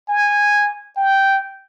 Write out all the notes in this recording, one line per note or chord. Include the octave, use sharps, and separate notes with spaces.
G#5
G5